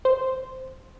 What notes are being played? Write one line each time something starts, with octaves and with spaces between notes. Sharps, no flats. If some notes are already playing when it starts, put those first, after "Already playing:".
C5